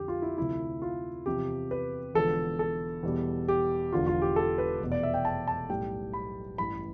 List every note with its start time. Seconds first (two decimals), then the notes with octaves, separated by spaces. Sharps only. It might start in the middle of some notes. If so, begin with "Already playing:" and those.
Already playing: F2 D3 G4
0.08 F4
0.22 E4
0.37 D2 C3 F3 E4
0.82 F4
1.26 E2 C3 F3 G4
1.71 B4
2.14 E1 E2 D3 F3 A4
2.59 A4
3.03 E2 B2 G3
3.48 G4
3.93 E1 E2 D3 F3 F4
4.07 F4
4.22 G4
4.36 A4
4.58 B4
4.80 F1 E2 B2
4.92 D5
5.03 E5
5.14 G5
5.25 A5
5.47 A5
5.69 B1 A2 G3 G5
6.13 B5
6.58 A1 G2 E3 B5